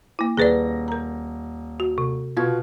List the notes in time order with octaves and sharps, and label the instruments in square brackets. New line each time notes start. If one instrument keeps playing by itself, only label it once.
[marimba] A#3 E4
[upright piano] D#1 A#6 [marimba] G#4 B4 D5
[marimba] A#4 A#5
F#4
C3
[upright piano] B2 F4 [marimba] B3 G#6